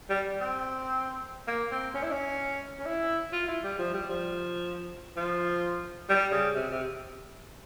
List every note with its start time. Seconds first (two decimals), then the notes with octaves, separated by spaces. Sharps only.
0.10 G3
0.40 C4
1.47 A#3
1.72 C4
1.95 C#4
2.03 E4
2.11 C#4
2.79 C#4
2.86 E4
3.32 F4
3.48 E4
3.64 G3
3.79 F3
3.93 G3
4.09 F3
5.17 F3
6.09 G3
6.32 C#3
6.55 C3
6.71 C3